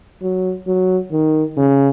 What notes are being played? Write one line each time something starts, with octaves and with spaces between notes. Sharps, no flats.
F#3
F#3
D#3
C#3